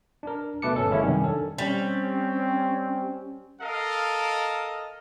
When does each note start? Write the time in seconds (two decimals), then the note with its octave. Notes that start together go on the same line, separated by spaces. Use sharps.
0.23 D4 A#4
0.62 B2 A3 B4 A5 D6 C#7
0.76 G1 C#4 A4
0.90 E3 G#3 A#3 C#4 E4 C#5
1.03 F#2 C3 D#3 G3 C#4
1.20 D4 A4
1.58 G3 C4 C#4
3.62 A4 A#4 D#5 F5